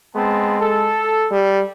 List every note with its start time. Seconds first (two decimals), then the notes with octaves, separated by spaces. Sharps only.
0.16 G#3 B3 C4 A5
0.61 A4
1.31 G3